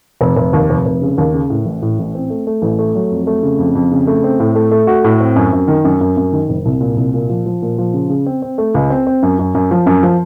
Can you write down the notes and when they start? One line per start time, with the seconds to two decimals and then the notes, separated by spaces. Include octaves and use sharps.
0.21 F1
0.36 F1
0.53 D#2
0.70 F1
0.85 F1
1.02 C#3
1.18 D#2
1.34 C#3
1.50 A2
1.65 A1
1.82 A2
1.99 A1
2.15 C4
2.30 A3
2.47 A3
2.62 A1
2.79 A3
2.95 F#3
3.11 F2
3.27 A3
3.43 C#3
3.58 F2
3.75 F2
3.91 C#3
4.07 A3
4.24 C4
4.40 A2
4.55 A3
4.71 A3
4.87 F#4
5.04 A2
5.20 C4
5.36 F#2
5.53 F#2
5.68 D#3
5.85 F#2
6.01 F#2
6.17 F#2
6.33 D#3
6.49 F#1
6.65 C2
6.80 A#2
6.97 C2
7.14 A#2
7.29 F3
7.46 F3
7.62 A#2
7.78 F3
7.94 C#3
8.09 C#3
8.26 C4
8.42 C4
8.58 A3
8.74 C#2
8.90 C4
9.07 C4
9.23 F#2
9.39 F#2
9.55 F#2
9.71 F3
9.86 F#2
10.03 F3